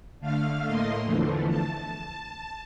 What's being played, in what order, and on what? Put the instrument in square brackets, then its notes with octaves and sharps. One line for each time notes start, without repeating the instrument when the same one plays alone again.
[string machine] D3 A3 F5 F6
A2 A3 A#3 D#5 C6
E2 D3 E3 F3 A3
A5